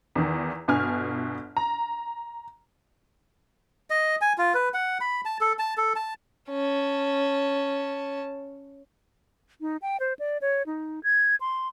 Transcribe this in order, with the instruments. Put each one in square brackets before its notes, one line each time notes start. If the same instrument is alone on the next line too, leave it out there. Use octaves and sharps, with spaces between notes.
[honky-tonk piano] E2 D#3
G1 B2 G#5 F6
A#5
[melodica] D#5
G#5
F4
B4
F#5
B5
A5
A4
A5
A4
A5
[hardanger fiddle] C#4 A5
[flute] D#4
G5
C5
D5
C#5
D#4
G#6
C6